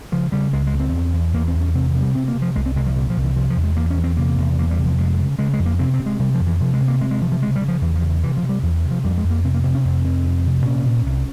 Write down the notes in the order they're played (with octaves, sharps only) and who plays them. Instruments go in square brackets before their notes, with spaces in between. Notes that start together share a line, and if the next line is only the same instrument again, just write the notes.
[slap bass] C#3 F3
C#3 G3
C#2 G#3
G#3
C#2
C4
E2
E2
E2 A#3
C4
E2
C#4
C3 C4
E3
C3
G3
C3 C4
A#3
C3
F3
C2 G#3
C4
C2 G#3
F3
A#2 G3
F3
C2
E3
C3 F3
F3
E2
G#3
E2 A#3
C#4
E2
C4
C3 A#3
E2
E2 A#3
G3
C3
F3
F2 G#3
C#3
C#3 G#3
G#3
F2
A#3
C3 C4
C4
C3
G#3
C3 G3
F3
F2
E3
C3 F3
G#3
C3
A#3
C3 G#3
G#3
C3 F3
F3
C#3 G#3
G3
C#3
F3
E2 E3
F3
C#3
E3
C3 E3
F3
C3
G3
E2 F3
E3
C3
F3
F2 G3
G#3
F2
A#3
C3 C4
A#3
C3 C4
C#4
F2 C4
C3 C4
F2
C3
A#2 C#4
A#2
C2